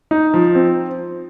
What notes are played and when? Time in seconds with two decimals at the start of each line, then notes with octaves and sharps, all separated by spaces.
0.11 D#4
0.34 F3
0.55 C4